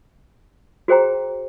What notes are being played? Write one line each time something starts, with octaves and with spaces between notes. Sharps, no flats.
F#4 G#4 C5 G5 A#5